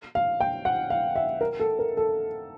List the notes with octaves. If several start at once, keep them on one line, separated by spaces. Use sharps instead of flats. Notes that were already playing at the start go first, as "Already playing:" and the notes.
F5
G5
F#5
F5
E5
A#4
A4
A#4
A4